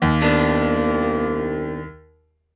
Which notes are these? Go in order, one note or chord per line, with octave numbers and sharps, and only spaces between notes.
D#2 A#3
C2 B3 D4 D#4